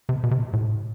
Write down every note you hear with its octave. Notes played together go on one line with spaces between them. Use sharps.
C3
B2
C3
A2